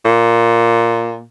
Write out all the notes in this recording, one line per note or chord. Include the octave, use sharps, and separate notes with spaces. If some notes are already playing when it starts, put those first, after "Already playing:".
A#2